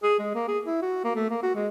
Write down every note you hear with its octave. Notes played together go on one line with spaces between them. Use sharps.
G#4
G#3
A#3
G#4
E4
F#4
A#3
A3
A#3
F#4
G#3